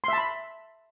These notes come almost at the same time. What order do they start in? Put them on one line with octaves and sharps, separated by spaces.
C6 E5 A5 B5